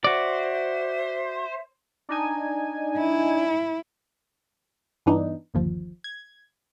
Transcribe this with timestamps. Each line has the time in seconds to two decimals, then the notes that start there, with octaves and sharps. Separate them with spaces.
0.04 F#4 C5 D5 E5
2.09 D4 D#4 G#5
2.97 E4
5.06 G2 E3 B3 D4 D#4
5.54 G1 D#2 F3
6.04 G#6